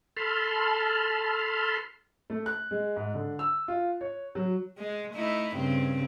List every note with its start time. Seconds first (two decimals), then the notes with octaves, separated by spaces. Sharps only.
0.17 A4 A5 B5 C6 F6
2.30 A3
2.46 F#6
2.71 G#3
2.96 G#2
3.14 D3
3.39 E6
3.68 F4
4.01 C#5
4.35 F#3
4.78 G#3
5.14 A3 D#4 E4
5.56 G2 C#3 C4